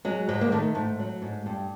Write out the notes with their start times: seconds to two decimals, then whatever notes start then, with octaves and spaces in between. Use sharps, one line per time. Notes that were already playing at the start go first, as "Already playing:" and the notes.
0.05 F#3 G#3
0.29 G#2 G#3
0.41 A#3
0.52 D#3 A3
0.75 G#2 A3
0.99 F#3
1.22 G#2
1.46 G2